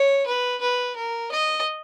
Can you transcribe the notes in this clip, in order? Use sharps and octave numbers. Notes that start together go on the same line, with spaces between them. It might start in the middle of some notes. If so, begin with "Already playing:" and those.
Already playing: C#5
B4
B4
A#4
D#5